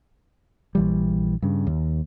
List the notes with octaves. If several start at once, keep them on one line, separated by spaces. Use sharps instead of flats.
A#1 E3 G3
G2 C#3
D#2